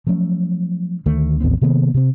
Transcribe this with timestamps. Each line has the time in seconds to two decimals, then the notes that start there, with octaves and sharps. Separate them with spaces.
0.07 F3 F#3 A3 C#4
1.06 D2 D#3 A3
1.40 A1 D#2 B3 C4
1.61 C3 D#3 A#3 B3
1.94 C3 C4